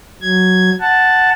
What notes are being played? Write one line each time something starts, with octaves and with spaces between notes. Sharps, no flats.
F#3 G#6
F#5 A5